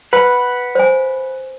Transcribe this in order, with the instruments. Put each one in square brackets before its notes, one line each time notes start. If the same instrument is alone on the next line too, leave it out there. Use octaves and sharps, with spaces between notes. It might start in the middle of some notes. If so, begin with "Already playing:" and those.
[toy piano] B4 [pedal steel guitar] F#5 B5
[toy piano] C5 G#5